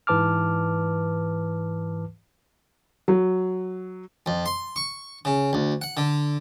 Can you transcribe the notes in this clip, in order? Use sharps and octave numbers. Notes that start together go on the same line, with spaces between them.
G#2 E3 B4 A5 D6 F6
F#3
F2
C6
C#6
C#3
D2
F#5
D3